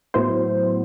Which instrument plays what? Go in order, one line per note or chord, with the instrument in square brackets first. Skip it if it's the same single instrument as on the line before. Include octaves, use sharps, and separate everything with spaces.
[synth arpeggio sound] A2 F#3 B3 E4 C5